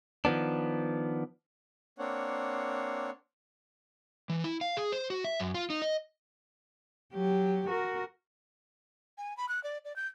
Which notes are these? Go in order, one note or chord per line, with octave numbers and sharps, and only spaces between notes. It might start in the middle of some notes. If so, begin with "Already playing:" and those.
D#3 F3 B3 D4
A#3 C4 D4 C#5 F#5
E3
E4
F5
G#4
C5
F#4
E5
F#2
F4
D#4
D#5
F#3 G4
F#4 A#4
G#5
B5
F#6
D5
D5
G6